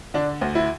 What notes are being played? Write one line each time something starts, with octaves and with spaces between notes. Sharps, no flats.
D3 D4
D2
E4